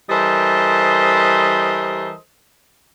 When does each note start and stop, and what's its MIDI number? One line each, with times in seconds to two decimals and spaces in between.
0.10 2.13 52
0.10 2.13 55
0.10 2.13 69
0.10 2.13 70
0.10 2.13 72
0.10 2.13 75